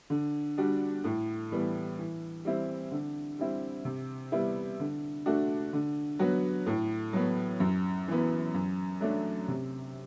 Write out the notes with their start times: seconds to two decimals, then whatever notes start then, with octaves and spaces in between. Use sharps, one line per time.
0.10 D3
0.58 G3 D4 F#4
1.04 A2
1.52 E3 G3 B3
1.99 E3
2.45 G3 C4 E4
2.92 D3
3.39 G3 C4 E4
3.85 C3
4.32 G3 B3 E4
4.80 D3
5.26 A3 D4 F#4
5.73 D3
6.19 F#3 B3 F#4
6.66 A2
7.13 F#3 B3
7.60 F#2
8.08 E3 B3
8.54 F#2
9.01 F#3 A3 D4
9.48 C3